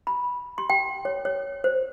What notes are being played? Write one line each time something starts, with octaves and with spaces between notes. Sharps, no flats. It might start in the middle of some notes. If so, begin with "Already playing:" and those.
B5
C6
G5
C#5
C#5
C5